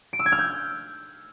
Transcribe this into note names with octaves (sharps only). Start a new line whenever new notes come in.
D7
E6
G#6
F6
G6